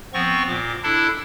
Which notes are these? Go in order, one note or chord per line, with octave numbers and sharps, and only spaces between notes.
F3 B3 C4 C#6
A#2 D6
D4 E4 A4